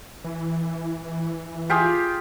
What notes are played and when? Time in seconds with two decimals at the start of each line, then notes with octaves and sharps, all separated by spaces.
0.24 E3
1.70 F4 G4 G#4